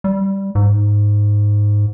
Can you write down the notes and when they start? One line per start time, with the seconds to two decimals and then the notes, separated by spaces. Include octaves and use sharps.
0.04 G3
0.55 G#2